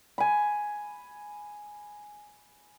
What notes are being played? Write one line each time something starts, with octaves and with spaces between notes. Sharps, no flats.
G#5 B5